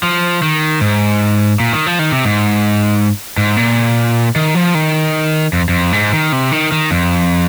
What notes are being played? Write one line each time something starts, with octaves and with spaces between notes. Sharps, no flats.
F3
D#3
G#2
A#2
D#3
F3
D#3
C3
G#2
G#2
A#2
D#3
F3
D#3
F2
F2
G#2
D#3
C3
D#3
D#3
F2